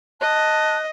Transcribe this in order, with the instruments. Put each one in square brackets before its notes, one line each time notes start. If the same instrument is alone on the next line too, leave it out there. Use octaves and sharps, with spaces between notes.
[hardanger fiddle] D#5 [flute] A5 [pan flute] F#6